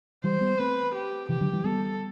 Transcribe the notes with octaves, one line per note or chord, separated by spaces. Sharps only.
E3 G3 C5
G3 B3
A3 C4 B4
G4
C3 E3 G4
D3 F#3
E3 G3
G3 B3 A4